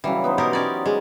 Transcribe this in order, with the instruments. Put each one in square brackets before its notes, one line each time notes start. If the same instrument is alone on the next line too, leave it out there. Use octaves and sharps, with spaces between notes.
[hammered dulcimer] C#3 F#3 G3 [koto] E3
[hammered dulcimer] B3 D#4 C5
[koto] B2 G4 A#4
C#4 D5
G#3